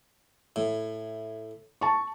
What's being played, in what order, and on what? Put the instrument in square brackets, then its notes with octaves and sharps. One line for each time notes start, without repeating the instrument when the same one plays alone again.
[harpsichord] A2
[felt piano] A5 C#6